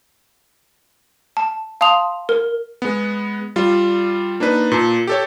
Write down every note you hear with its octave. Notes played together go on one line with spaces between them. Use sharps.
A5
F5 A5 C6 D#6 F7
A#4
G#3 B3
G3 F4
A#3 D4 D#4 B4
A#2 A5
G4 A4 C#5